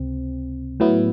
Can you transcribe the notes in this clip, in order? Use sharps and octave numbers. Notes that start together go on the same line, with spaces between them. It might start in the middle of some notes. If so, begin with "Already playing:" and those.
Already playing: C#2 C3 C4
A2 F#3 B3 E4